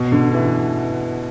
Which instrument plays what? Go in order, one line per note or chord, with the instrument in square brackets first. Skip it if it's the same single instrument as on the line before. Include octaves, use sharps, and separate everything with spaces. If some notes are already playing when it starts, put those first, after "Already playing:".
Already playing: [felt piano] B2
D3
E3